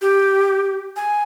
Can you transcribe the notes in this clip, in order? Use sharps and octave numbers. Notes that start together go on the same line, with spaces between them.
G4
G#5